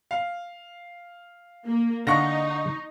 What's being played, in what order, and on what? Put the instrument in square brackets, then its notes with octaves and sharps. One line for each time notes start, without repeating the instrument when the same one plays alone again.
[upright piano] F5
[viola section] A#3
[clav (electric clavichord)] D3 F5 F#5 [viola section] D#4 [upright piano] C#6 A#6